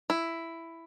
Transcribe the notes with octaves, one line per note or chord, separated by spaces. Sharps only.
E4